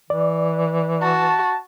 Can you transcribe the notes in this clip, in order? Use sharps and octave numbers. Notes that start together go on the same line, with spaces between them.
E3 D5
F#4 A5